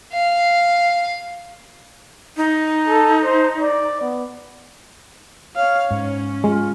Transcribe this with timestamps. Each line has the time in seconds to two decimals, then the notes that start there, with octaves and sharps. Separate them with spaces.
0.13 F5
2.37 D#4
2.89 A4
3.24 C5
3.59 D5
4.01 B3
5.56 C#5 F5
5.91 G#2 C#4
6.44 G#3 F4